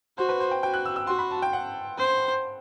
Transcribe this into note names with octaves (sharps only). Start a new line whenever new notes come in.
F#4 C5
B4
C5
G5
F#4 G5
F#6
E6
E6
F#4 C6
B5
A5
G5
F#5
C5